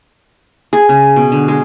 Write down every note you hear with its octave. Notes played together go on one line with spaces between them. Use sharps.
G#4
C#3
B2
D3
G#3